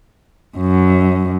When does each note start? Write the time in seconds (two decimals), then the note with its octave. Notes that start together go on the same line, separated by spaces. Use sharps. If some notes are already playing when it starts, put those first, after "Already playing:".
0.57 F#2